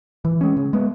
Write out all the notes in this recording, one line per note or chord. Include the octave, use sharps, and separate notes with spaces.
E3
G#3 C#4
C#3
G#3 B3